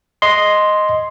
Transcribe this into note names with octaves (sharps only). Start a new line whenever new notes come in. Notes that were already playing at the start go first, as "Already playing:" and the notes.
D#5 C6